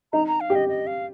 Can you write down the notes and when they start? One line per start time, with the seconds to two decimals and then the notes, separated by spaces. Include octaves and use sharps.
0.13 D#4 A#5
0.27 A#5
0.40 F5
0.50 G4
0.55 D#5
0.69 D#5
0.87 F5